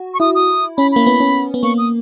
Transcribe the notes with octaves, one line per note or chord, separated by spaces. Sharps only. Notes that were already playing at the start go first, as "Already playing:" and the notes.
Already playing: F#4
C#6
E4 D#6
D#6
C#4 B5
A#3 B5
B3
C#4
B3
A#3 C#6
D#6